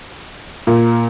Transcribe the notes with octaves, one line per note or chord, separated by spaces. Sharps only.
A#2